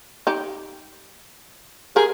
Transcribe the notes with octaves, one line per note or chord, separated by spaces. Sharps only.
D#4 G4
G4 G#4 A#4